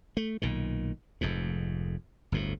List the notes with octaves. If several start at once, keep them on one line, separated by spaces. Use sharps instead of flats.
A3
B1 A#2 D#3
F1 F2 G#2
G1 D2 A2